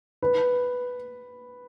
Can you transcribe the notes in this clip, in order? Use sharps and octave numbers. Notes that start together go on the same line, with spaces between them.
B4